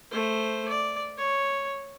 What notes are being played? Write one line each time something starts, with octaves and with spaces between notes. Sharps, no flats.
A3 C5
D5
C#5